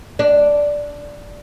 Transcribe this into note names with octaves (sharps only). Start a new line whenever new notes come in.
D4